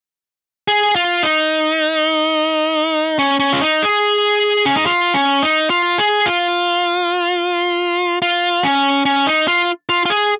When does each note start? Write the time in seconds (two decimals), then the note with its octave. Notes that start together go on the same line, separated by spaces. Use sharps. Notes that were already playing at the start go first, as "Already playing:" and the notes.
0.68 G#4
0.96 F4
1.23 D#4
3.19 C#4
3.40 C#4
3.53 F4
3.61 D#4
3.82 G#4
4.66 C#4
4.76 D#4
4.86 F4
5.14 C#4
5.42 D#4
5.70 F4
5.98 G#4
6.26 F4
8.22 F4
8.64 C#4
9.05 C#4
9.27 D#4
9.48 F4
9.89 F4
10.06 F4
10.10 G#4